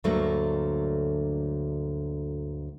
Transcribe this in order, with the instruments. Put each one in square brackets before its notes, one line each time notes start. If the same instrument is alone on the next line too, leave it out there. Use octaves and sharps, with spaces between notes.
[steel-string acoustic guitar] D2 G2 D3 F#3 A3 A#3